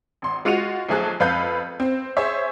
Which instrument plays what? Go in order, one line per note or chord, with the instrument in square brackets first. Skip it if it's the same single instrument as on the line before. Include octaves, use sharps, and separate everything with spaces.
[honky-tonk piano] G#1 C6
G#3 F4 F#4 C#7 D#7 F7
B1 F3 A3 G#4 A5 F#6
F2 B4 F5 F#6 G6
C4
G#4 C5 C#5 E5